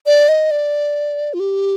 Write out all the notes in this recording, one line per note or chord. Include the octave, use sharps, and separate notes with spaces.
D5
D#5
D5
F4
G4